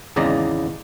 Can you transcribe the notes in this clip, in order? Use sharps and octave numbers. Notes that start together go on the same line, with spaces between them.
G#1 E2 C#3 D5 D#5 A#5